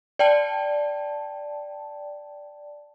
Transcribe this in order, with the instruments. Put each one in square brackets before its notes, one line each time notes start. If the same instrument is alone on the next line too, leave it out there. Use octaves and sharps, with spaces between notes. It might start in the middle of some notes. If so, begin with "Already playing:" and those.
[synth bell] D5 G5 A5